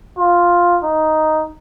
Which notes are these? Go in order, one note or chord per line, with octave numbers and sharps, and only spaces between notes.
F4
D#4